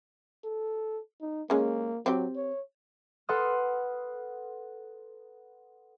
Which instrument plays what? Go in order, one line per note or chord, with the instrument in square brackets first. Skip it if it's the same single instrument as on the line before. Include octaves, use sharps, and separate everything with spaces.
[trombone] A4
D#4
[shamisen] G#3 C#4 [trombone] A#3
[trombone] F#3 [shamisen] C4 G4
[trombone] C#5
[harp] A4 B4 F#5 C6 D#6 F6